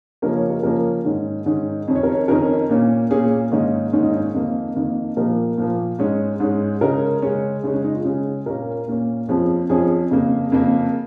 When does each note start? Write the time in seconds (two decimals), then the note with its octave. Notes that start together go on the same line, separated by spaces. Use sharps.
0.22 C#3 F3 A#3 C#4 A#4
0.36 C#5
0.50 A#4
0.63 C#3 F3 A#3 C#4 A#4
1.05 G#2 D#3 C#4
1.46 G#2 D#3 C#4
1.88 F2 D#3 C#4
1.95 C#5
2.03 A#4
2.12 C#5
2.28 F2 D#3 C#4 A#4
2.70 A#2 A#3 C#4
3.11 A#2 A#3 C#4 G#4
3.52 G#2 D#3 A#3 C#4 D#4
3.93 G#2 D#3 A#3 C#4
4.03 D#4
4.13 C#4
4.24 C#4
4.34 F2 D#3 A#3
4.76 F2 D#3 A#3
5.17 A#2 F3 A#3 A#4
5.58 A#2 F3 A#3
5.99 G#2 G#3 C#4
6.40 G#2 G#3 C#4
6.81 C#3 G#3 C#4 A#4
7.22 C#3 G#3 C#4
7.63 C#3 G#3 C#4
7.74 C#4
7.84 D#4
7.95 F4
8.05 C#3 G#3 C#4 G#4
8.46 A#2 A#3 C#4 A#4
8.87 A#2 A#3 C#4
9.28 F2 F3 C#4 G#4
9.69 F2 F3 C#4 G#4
10.11 F2 C#3 A#3
10.52 F2 C#3 A#3